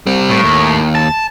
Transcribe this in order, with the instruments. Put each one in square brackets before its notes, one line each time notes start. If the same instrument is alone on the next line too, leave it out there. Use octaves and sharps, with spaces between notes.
[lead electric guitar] G3 C4
[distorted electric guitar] A2
[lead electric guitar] D#2
[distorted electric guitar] A5